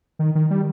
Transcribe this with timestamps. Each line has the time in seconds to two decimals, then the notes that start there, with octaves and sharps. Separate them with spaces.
0.19 D#3
0.35 D#3
0.51 G3